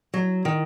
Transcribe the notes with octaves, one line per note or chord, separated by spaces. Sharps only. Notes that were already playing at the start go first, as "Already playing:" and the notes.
F#3
D#3